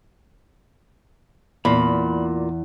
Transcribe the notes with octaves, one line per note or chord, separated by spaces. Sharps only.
E2 A#2 B5